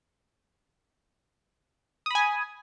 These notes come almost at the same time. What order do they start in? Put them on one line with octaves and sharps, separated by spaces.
D#6 B5 G#5